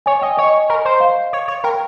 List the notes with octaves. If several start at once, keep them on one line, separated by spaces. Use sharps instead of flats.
C#5 G#5
D#5 G5
C#5 D#5
A#4
C5
F5
C#5
C#5
A#4 G5